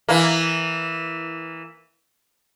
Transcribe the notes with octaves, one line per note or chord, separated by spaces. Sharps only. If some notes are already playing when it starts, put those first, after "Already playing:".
E3 A#3